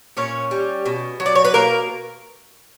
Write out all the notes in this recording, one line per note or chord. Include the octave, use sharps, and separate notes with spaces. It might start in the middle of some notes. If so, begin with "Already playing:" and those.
A#2 C#4 C#5
G3
B2
F#3
D5
C#5
B4
B2 A#3 A#4